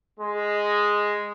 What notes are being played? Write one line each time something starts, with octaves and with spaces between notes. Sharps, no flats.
G#3